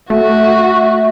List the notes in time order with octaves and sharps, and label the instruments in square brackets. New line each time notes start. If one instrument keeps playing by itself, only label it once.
[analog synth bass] A3 [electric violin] F#4 [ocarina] E5